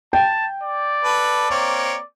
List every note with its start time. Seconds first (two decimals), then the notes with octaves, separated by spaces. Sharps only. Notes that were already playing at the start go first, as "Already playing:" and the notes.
0.13 G5 A5
0.63 D5
1.04 A4 B4
1.51 A#3 C4 C#5